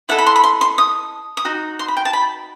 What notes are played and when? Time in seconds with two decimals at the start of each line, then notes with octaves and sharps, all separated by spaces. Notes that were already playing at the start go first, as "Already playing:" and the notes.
0.09 E4 A4 D#5 F#5
0.18 B5
0.26 C6
0.36 B5
0.44 C6
0.61 C6
0.78 D#6
1.37 D#6
1.45 D#4 F#4
1.79 C6
1.88 B5
1.97 G5
2.05 A5
2.13 B5